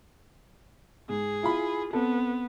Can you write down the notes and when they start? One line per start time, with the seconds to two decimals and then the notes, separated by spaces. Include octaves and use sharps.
1.09 G#2 G#4
1.43 E4 F4 B5
1.93 B3 C4 A4